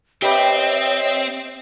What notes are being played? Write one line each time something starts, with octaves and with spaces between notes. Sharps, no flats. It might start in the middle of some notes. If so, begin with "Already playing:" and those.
C4 G4 B4 C#5 D#5 E5 G5